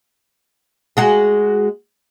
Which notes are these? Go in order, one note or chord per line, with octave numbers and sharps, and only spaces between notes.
G#3 F#4 G#4